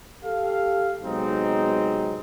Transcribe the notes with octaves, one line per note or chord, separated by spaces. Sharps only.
G4 A4 F5
C3 F#3 G#3 B3 C4 D#4